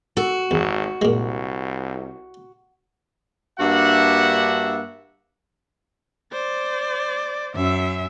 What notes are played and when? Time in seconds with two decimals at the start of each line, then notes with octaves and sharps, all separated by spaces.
0.17 F#4 A4
0.51 G#1 E2
1.02 C2 A#2 G#3
3.59 G2 A#3 D4 F#4 E5 F#5
6.32 C5 D5
7.56 F#2 E5